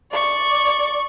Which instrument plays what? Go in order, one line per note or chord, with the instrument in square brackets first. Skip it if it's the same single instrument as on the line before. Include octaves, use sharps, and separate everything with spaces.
[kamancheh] D5 C#6